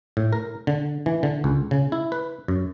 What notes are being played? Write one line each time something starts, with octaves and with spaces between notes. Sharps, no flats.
A2
A#4
D3
E3
D3
C#2
C#3
E4
B4
F#2